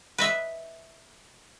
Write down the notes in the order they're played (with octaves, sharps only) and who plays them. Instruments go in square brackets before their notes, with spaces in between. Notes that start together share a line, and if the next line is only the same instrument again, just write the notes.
[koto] B4 D#5 E5